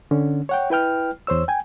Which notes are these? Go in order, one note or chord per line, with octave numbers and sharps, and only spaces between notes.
D3 C#4
C#5 F#5 G5
E4 B4 G5 F6
E2 C5 C#5 E6
G5 G#5